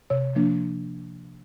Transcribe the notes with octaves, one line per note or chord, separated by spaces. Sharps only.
C3 C#5
F3 A#3 D4